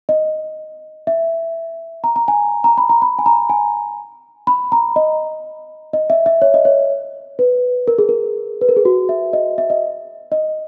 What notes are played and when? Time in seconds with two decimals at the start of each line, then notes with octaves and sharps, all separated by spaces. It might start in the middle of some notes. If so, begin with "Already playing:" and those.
0.09 D#5
1.07 E5
2.04 A#5
2.16 A#5
2.28 G#5
2.64 A#5
2.78 B5
2.89 A#5
3.02 B5
3.19 G#5
3.26 A#5
3.50 G#5
4.47 B5
4.72 A#5
4.96 D#5
5.93 D#5
6.10 E5
6.26 E5
6.42 C#5
6.54 D#5
6.65 C#5
7.39 B4
7.88 A#4
7.98 G#4
8.09 A#4
8.61 B4
8.69 A#4
8.77 G#4
8.85 F#4
9.09 E5
9.33 D#5
9.58 E5
9.70 D#5
10.32 D#5